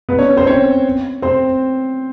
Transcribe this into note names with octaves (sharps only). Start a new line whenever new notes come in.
B3 B4
C#4 C#5
C4 C5
C#4 C#5
C4 C5